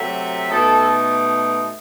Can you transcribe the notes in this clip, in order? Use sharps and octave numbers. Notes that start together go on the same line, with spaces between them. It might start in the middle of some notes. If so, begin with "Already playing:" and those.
Already playing: C3 F#3 A3 E5
B2 A3 D#4 A4